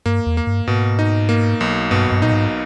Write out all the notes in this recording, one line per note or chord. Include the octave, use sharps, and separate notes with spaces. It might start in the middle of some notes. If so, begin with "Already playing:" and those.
G2 A#3
E2
A#3
G2
G#2 B2
D#4
A#3
B1
G2 B2
G2
A#2 D#4
G#2